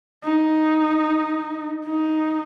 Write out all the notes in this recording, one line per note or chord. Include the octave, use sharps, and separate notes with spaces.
D#4
D#4